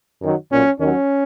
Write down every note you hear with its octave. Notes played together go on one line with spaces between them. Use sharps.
F#2 D#3 F#3
B1 A#2 F#3 C#4
D#2 D#3 F#3 C#4